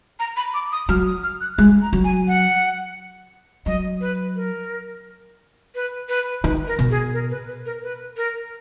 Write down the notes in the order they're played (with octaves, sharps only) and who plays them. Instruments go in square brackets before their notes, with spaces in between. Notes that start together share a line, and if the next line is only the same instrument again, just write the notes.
[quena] A#5
B5
D6
D#6
[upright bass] F#3 [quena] F6
[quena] D#6
F6
F#6
[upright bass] G#3 [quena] F#6
[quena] A#5
[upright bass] F#3
[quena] G#5
F#5
[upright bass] F#3 [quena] D#5
[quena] B4
A#4
B4
B4
[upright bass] D#3 [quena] B4
[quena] A#4
[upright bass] B2
[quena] G#4
A#4
B4
B4
A#4
B4
A#4